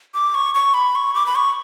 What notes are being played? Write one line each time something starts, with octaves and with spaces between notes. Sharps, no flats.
D6
C#6
C#6
B5
C#6
D6
B5
C#6